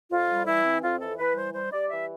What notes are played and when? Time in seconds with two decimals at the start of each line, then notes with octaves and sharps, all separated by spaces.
0.11 F2 F4
0.29 G3
0.47 E3 E4
0.65 C4
0.83 F2 F4
1.01 E3 A4
1.19 E3 B4
1.37 G3 C5
1.54 G3 C5
1.72 G3 D5
1.90 E3 E5